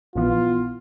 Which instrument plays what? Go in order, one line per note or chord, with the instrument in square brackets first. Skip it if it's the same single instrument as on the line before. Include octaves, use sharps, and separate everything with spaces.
[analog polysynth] A#1 E3 B3 [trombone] F4